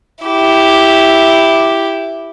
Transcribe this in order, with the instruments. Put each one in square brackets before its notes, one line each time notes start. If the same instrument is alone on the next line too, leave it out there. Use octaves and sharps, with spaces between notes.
[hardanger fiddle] E4 G4